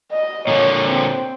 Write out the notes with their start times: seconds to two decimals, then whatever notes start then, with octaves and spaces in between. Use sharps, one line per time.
0.12 D#5
0.47 A#2 D3 C#5
0.88 C4